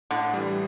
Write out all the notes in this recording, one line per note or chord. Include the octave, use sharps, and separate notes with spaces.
A2 D3
E3 G3